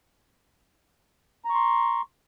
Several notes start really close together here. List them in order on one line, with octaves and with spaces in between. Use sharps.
A#5 C#6 C6